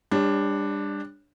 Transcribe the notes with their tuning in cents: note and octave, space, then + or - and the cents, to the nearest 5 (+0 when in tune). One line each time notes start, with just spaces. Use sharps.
G3 +35 D4 +5 C#5 +0